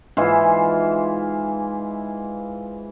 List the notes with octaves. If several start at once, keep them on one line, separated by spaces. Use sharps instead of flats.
G#2 E3 E4 F4